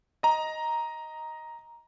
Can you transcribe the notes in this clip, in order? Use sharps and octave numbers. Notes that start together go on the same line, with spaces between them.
D#5 A#5